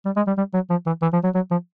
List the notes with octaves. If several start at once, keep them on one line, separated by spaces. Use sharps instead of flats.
G3
G#3
G3
G3
F#3
F3
E3
E3
F3
F#3
F#3
F3